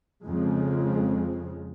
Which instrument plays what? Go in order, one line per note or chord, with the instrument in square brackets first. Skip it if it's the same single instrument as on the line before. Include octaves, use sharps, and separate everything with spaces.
[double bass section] F2 C#3 F3 G#3